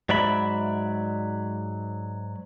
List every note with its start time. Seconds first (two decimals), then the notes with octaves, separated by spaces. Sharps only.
0.09 G#2 F#3 D5 E5 B5